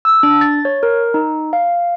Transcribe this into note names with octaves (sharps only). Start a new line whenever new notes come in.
E6
D4
A6
C#5
A#4
D#4
F5